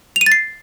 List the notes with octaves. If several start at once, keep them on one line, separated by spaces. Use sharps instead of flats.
F7
D#7
A6
C7